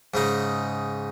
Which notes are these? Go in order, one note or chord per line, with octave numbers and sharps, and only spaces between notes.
G#2 C#3 D#4